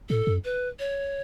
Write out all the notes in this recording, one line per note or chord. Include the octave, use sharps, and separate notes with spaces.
A2 A4
F#2
B4
C#5